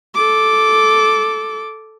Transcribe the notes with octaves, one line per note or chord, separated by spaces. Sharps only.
A4 D6